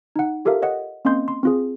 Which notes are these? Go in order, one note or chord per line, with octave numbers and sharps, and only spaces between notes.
D#4 F#5
F4 G4 A4 A#4 E5 F5
C#5 D#5 F#5
A#3 C4 C#4 D#5 C6 G6
C6
C4 F4 G#4